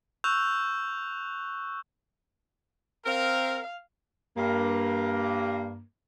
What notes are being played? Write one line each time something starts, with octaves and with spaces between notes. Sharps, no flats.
C#6 E6 F#6 G6 F7
C4 A#4 F5
G2 A#3